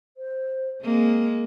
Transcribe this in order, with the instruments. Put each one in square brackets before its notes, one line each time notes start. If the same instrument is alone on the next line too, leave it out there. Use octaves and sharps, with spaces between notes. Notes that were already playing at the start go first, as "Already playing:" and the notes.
[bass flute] C5
[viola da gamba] G#3 A#3 [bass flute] C4